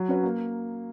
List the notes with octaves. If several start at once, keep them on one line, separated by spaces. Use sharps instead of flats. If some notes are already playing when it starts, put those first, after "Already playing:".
Already playing: F#3
C#4 F#4 B4
A#3